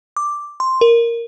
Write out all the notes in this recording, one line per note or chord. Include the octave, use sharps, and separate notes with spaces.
D6
C6
A#4